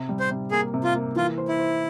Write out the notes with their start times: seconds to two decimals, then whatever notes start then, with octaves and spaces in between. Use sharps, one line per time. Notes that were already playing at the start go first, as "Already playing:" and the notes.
Already playing: C3
0.09 G3
0.20 C5
0.31 C3
0.51 A#3 G#4
0.74 C3
0.84 F4
0.94 A#3
1.16 E3 F4
1.38 C5
1.48 E4
1.59 C5